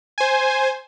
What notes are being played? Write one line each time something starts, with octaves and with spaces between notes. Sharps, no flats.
C5 G#5